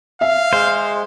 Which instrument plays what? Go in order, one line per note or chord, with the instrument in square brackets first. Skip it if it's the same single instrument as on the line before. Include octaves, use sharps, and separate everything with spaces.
[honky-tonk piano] E5 [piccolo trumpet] F5
[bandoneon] G#3 [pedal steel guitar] C5